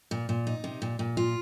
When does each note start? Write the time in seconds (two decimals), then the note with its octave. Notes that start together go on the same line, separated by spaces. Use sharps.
0.11 A#2
0.29 A#2
0.47 D#4
0.64 C3
0.82 A#2
0.99 A#2
1.17 F4